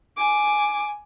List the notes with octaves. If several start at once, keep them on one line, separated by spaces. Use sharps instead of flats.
G#5 D6